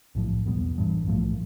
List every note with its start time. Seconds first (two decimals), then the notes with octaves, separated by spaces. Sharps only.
0.15 B1 A2 F3
0.46 E2 B2 G3 B3
0.77 A1 G2 E3
1.07 B1 A2 F3 A3